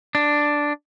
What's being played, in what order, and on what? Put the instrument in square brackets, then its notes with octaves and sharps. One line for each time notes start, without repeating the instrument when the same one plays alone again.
[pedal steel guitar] D4